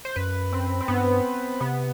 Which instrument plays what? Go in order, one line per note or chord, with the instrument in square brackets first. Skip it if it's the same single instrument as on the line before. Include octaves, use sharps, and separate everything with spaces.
[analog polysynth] C5
[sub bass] F#2 [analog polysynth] B4
[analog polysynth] C4
C4
[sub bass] G2 [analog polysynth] B3
[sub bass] C3 [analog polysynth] B3